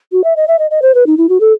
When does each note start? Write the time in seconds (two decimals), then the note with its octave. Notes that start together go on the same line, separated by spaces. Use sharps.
0.12 F#4
0.24 E5
0.36 D#5
0.48 E5
0.59 D#5
0.71 D#5
0.82 C5
0.94 B4
1.06 D#4
1.17 E4
1.29 F#4
1.40 A4